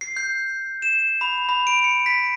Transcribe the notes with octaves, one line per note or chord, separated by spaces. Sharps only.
C7
G6
E7
B5
B5
D7
C#7
B6